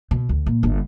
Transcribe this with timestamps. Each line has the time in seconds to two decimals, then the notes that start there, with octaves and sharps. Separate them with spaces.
0.11 B2
0.29 D2
0.46 A#2
0.63 G1